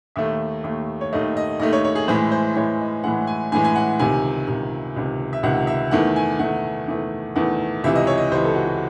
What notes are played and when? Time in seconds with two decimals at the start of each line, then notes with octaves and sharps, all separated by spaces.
0.16 D#2 D#3 A3 E5
0.64 D#2 D#3 A3
1.01 C#5
1.13 D#2 D#3 A3 D#5
1.37 D#5
1.59 D#2 D#3 A3 D#5
1.73 C#5
1.84 C#5
1.95 G#4
2.08 A2 E3 G#3 C5
2.32 C5
2.56 A2 E3 G#3 C#5
2.81 D#5
3.04 A2 E3 G#3 F#5
3.27 G#5
3.52 A2 E3 G#3 G#5
3.65 G#5
3.76 F#5
3.99 C#2 C3 D#3 G#5
4.47 C#2 C3 D#3
4.96 C#2 C3 D#3
5.33 E5
5.43 C#2 C3 D#3 F#5
5.67 E5
5.91 E2 D#3 A3 F#5
6.16 G#5
6.39 E2 D#3 A3 F#5
6.88 E2 D#3 A3
7.36 E2 D#3 A3 F#5
7.84 C#2 C3 E3 E5
7.96 D#5
8.07 C#5
8.18 D#5
8.31 C#2 C3 E3 C5
8.44 A4
8.55 F#4
8.67 F#4